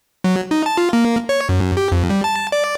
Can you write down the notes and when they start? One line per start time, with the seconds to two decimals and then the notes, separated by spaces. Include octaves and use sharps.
0.24 F#3
0.51 D#4
0.66 A5
0.77 F4
0.93 A#3
1.29 C#5
1.49 F#2
1.77 G4
1.92 F2
2.10 G3
2.24 A5
2.52 D5